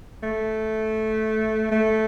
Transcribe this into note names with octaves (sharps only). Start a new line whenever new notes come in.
A3
A3